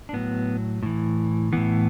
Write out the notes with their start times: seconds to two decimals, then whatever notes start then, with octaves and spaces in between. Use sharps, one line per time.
0.09 D4
0.13 A2 F#3 B3
0.83 A2 E3
1.53 A2 E3 B3